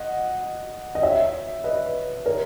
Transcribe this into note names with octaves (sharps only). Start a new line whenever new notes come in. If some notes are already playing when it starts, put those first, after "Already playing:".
Already playing: D#5 F#5
D#5
C#5 E5
B4 D#5
A#4 C#5